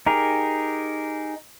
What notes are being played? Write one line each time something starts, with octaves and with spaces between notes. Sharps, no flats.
D#4 G4 G#4 A#4